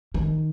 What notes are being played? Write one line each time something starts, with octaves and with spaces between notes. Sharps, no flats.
D#3